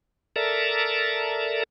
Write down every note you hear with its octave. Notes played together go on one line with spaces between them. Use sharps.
A4 A#4 D5 E5 A5 A#5